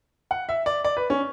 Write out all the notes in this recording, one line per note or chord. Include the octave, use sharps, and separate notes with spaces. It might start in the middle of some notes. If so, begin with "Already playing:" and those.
F#5
E5
D5
D5
B4
C#4